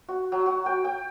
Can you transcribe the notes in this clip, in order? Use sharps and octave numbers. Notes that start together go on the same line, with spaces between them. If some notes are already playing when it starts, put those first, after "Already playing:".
F#4
F#3
F#4
G5
G5